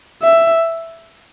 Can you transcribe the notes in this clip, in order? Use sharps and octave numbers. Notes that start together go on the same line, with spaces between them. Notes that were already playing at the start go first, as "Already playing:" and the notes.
E5